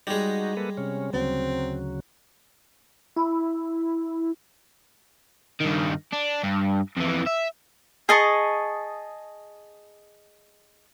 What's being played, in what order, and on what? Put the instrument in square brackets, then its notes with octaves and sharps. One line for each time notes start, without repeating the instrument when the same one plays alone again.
[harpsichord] G3 G#3 [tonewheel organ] D#4 F#4
[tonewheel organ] A#3 A4 B4
C3 C#4
[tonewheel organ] D2 C#3 F#3 [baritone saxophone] C4
[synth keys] E4
[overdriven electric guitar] G2 D#3
D4
G2
F2 E3
E5
[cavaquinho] G#4 D#5 A5 C#6